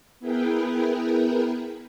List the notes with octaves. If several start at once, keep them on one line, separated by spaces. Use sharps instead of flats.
B3 E4 G#4 A#4 B4 G5